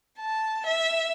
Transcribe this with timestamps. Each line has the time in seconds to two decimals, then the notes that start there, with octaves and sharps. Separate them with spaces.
0.19 A5
0.65 E5